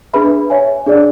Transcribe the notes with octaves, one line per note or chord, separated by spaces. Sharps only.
D4 G#4 B4 E5 B5
C#5 E5 G#5
D4 G#4 D5